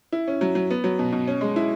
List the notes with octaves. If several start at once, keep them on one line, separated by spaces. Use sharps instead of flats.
E4
C#4
F#3
F#3
B3
F#3
B2
B2
C#4
G#3
E4